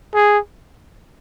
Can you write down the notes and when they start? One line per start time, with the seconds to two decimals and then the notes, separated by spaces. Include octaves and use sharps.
0.14 G#4